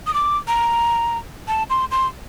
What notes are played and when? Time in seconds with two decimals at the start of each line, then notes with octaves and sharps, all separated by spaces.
0.07 D#6
0.14 D6
0.48 A#5
1.48 A5
1.70 C6
1.91 C6